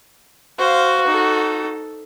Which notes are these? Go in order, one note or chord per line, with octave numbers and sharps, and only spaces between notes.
F#4 C5 F5
D#4 A4